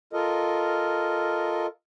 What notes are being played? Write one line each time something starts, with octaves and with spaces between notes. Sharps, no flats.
F4 A4 A#4 D#5